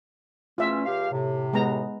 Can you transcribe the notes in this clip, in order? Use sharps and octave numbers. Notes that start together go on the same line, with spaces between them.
E2 A3 C#4 F4 E5
C#2 G4 F5
A2 C3
G#3 B3 A#5